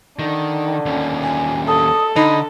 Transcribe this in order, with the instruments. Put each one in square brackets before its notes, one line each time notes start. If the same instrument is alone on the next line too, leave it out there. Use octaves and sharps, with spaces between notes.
[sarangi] D3 [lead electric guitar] D#3
[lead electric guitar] D#2 C#4
[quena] G#5
[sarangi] A4 [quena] D#6
[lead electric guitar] D3 [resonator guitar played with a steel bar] D#4 [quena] B5